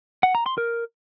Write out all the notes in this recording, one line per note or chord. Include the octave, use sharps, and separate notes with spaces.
F#5
A#5
C6
A#4